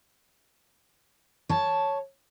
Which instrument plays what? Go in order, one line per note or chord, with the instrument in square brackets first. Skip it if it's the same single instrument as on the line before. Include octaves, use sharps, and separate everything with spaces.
[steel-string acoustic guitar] C#5 A5